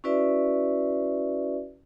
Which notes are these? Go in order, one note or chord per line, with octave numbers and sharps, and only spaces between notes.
C#4 E4 F#4 B4 D5 E5